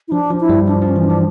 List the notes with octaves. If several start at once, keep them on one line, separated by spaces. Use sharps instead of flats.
E4
F3 D4
F3
E4
G2 G3
F3 D4
F3
C#4
E3
D4
F3